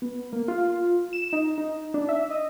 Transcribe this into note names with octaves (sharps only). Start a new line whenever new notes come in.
B3
A#3
F4
E7
D#4
D#4
D4
E5
D#5